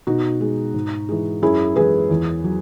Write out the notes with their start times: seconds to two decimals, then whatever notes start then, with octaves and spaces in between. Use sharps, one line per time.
0.07 B2 D#4 F#4
0.41 G#3
0.74 G#2
1.09 E3 G#3
1.42 F#2 E4 G#4
1.76 E3 G#3 G#4 B4
2.11 E2
2.44 F#3